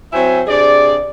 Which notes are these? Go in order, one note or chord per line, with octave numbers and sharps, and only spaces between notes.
F#3 C4 E4 C5 E5 G#5
C3 D4 G#4 D5